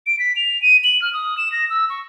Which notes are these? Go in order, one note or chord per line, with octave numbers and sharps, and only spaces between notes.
D7
B6
F7
D#7
F#7
F6
D#6
E7
A#6
E6
C#6